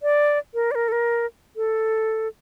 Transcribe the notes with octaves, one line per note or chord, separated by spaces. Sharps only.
D5
A#4
D5
A#4
A4
A#4
A4